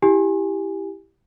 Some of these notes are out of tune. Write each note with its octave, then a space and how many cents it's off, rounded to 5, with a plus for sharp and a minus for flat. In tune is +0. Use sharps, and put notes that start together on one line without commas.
E4 +0 G4 +0 G#5 +0